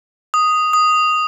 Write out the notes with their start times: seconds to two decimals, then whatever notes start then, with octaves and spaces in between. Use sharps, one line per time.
0.34 D#6
0.73 D#6